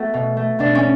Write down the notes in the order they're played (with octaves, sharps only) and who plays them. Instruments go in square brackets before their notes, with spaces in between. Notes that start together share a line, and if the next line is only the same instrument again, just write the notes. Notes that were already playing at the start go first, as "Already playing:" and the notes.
Already playing: [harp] A3 B3 F#4 A4
B2
A3
B2 D4
C#4